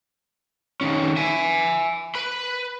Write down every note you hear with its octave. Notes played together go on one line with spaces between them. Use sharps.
D#3 C#4
E5 G#5
B4 B5